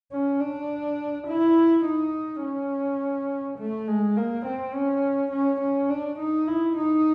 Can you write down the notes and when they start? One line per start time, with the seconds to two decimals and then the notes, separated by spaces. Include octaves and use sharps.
0.12 C#4
0.40 D4
1.27 E4
1.85 D#4
2.43 C#4
3.59 A3
3.88 G#3
4.17 A#3
4.46 C4
4.74 C#4
5.32 C#4
5.61 C#4
5.90 D4
6.20 D#4
6.47 E4
6.77 D#4